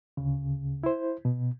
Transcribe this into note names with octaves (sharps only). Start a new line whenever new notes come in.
D2 C#3
E4 C5
B2